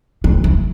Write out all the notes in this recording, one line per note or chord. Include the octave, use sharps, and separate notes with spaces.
D#3
E3